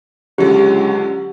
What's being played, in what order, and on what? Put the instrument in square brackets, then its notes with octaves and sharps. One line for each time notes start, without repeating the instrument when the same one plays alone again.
[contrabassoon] C#2 [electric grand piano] D3 F#3 F4 [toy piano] G4